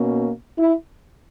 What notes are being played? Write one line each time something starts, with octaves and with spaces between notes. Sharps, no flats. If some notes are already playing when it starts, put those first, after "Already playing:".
Already playing: B2 A#3 C#4
E4